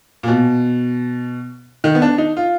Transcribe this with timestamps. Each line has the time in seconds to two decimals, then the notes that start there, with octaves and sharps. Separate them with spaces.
0.23 A#2
0.28 B2
1.84 D#3
1.95 B3
2.02 D4
2.18 D#4
2.37 F4